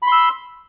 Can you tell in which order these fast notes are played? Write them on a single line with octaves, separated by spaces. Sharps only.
B5 C6 E6